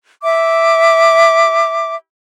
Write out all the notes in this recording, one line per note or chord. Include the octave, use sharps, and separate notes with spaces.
E5 D6